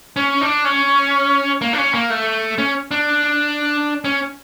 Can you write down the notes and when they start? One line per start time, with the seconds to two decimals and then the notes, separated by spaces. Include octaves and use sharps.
0.16 C#4
0.41 D4
0.65 C#4
1.61 A#3
1.73 D4
1.78 C#4
1.94 A#3
2.10 A3
2.58 C#4
2.91 D4
4.05 C#4